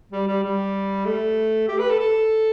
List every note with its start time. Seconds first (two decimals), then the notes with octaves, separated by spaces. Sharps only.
0.12 G3
0.27 G3
0.43 G3
1.06 A3
1.68 G4
1.79 B4
1.90 A4
2.00 A4